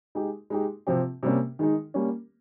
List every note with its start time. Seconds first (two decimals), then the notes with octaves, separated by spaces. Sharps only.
0.15 G#3 D#4 G4
0.50 G#3 D#4 G4
0.87 C3 F3 C4 G4
1.23 C3 G3 A#3 C#4
1.59 D#3 G#3 D#4
1.94 G3 A#3 C#4